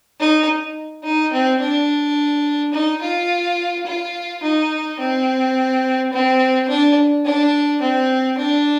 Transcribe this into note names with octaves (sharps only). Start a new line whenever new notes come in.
D#4
D#4
C4
D4
D#4
F4
F4
D#4
C4
C4
D4
D4
C4
D4